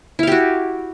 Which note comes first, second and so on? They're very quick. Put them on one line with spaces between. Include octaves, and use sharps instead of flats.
E4 F5 G4 F#4